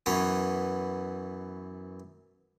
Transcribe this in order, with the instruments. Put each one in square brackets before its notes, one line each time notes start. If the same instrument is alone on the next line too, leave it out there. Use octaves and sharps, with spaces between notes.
[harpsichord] F#2 E3 B3 C#5